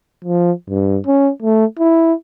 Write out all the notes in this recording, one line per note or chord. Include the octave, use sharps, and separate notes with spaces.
F3
G2
C#4
A3
E4